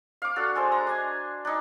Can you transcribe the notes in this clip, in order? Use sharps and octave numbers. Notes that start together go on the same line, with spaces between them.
F5 D6
D4 F#4 A4
G#3 A4 C5
A#5
D4 G#5
D4 D#4